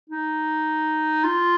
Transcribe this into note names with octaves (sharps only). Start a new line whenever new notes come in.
D#4
F4